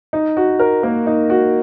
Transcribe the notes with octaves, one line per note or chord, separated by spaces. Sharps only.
D#4
F#4
A#4
A#3
D#4
F#4